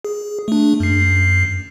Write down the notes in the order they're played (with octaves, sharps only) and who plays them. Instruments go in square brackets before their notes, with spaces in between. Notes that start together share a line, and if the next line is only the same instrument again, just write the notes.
[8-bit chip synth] G#4
A3 D4
F#2 C7